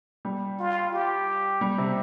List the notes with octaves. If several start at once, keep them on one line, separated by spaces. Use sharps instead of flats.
G3
F4
G4
G3
C3